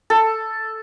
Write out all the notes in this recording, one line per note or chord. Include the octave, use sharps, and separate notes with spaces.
A4